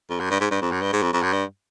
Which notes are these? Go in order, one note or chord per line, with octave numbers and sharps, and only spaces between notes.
F2
F#2
G2
G#2
G2
F2
F#2
G2
G#2
F2
F2
F#2
G2